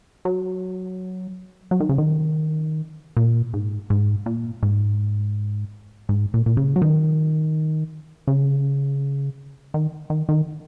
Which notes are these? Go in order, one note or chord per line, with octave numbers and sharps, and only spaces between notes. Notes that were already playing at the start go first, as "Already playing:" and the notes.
F#3
F#3
D#3
C#3
D#3
A#2
G#2
G#2
A#2
G#2
G#2
A#2
A#2
C#3
F#3
D#3
C#3
D#3
D#3
D#3